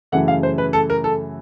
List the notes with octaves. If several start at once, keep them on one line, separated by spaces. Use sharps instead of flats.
F#2 C#3 E3 A3 F#5
F5
C5
B4
A4
A#4
A4